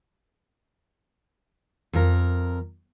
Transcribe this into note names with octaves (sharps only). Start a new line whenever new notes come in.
F2 A#4